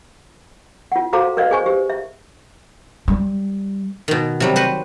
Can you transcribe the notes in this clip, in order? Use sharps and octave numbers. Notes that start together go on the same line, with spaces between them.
F4 F#5
F#4 A4 C5 F5 A#5 D6
A#4 B4 D5 D#5 F5
G#4 C5 G#5 C#6
G4 C5
E5
G3
B2 D#3
C3 F#3 G3
F#4 B4 C5